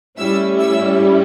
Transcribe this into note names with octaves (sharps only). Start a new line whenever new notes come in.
A2 G3 C#4 E4 E5 E6
E5 E6